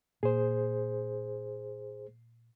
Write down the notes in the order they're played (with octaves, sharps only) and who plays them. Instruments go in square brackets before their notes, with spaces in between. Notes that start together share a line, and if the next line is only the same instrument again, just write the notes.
[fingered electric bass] A#2 [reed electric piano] G#4 C5